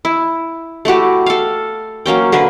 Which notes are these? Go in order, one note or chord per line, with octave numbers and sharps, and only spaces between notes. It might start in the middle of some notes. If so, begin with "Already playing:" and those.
E4
A3 E4 F#4 G4
A4 F5
F#3 A#3 C#4 G5
D3 A#3 A#4 B4